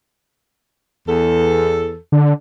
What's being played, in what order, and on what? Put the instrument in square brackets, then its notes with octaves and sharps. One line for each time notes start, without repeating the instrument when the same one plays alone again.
[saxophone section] E2 A4
[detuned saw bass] D3